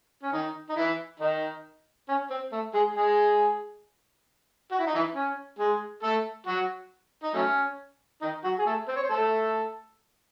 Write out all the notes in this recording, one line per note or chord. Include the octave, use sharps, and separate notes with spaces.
C#4
D#3 D#4
D#4
E3 E4
D#3 D#4
C#4
C4
A3
G#3 G#4
G#3 G#4
F#4
E4
D#4
E3 E4
C#4
G#3 G#4
A3 A4
F#3 F#4
D#4
F#3 A3 C#4
D#3 D#4
F#3 F#4
G#4
A3 A4
C4 C5
C#5
C5
A3 A4